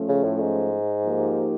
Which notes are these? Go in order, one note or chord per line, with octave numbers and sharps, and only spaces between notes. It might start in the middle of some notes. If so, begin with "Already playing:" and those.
Already playing: F3 A3 C#4
C#3
A2
G#2
F3 A#3 D#4 G4